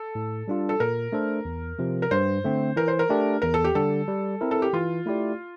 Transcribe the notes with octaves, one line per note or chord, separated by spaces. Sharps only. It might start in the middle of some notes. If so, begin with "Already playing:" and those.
Already playing: A4
A2
G3 D4 F4
A4
A#2 A#4
A3 D4 A4 C5
E2
C3 F3
A#4
G2 C5
D3 A3 C4
E3 A#4
C5
A#4
A3 D4 G4
E2 A#4
A4
G4
D3 G3 A4
G3
C4 E4 A#4
A4
G4
E3 F4
A3 E4 G4 D5